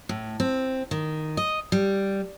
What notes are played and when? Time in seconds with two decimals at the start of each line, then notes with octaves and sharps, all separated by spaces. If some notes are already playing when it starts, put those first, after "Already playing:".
0.09 A2
0.40 C4
0.91 D#3
1.37 D#5
1.72 G3